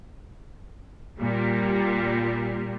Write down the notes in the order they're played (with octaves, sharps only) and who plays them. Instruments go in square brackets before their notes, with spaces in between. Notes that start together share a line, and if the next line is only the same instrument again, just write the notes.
[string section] A#2 G3